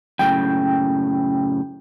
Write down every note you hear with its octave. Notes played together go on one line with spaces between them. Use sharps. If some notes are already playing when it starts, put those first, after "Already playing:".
F#2 A2 C#3 G5